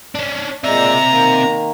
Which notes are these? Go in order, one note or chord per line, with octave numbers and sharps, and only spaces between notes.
C#4 D4
A#2 G#3 C4 D5 E5 A#5
D#3 A#3